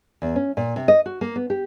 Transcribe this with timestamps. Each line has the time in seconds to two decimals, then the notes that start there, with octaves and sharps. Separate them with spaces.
0.22 E2
0.36 C#4
0.57 A#2
0.76 C3
0.88 D#5
1.06 F#4
1.21 A#3
1.36 B3
1.50 G4